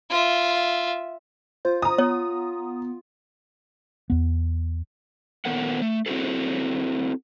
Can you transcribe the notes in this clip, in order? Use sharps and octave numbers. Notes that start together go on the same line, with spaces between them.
F4 E5
F4 C5
A#5 D#6
B3 C#5
E2 B3
A#2 D#3 B3 A4 A#4 F#5
A3
C4 E4 F#4 G#4 A4